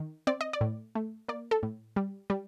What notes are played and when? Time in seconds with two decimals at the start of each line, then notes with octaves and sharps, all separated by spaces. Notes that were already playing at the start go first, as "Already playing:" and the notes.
Already playing: D#3
0.27 C4 D5
0.41 D#5
0.53 D5
0.61 A2
0.95 A3
1.28 A#3 D5
1.51 A4
1.63 A2
1.96 G3
2.30 G3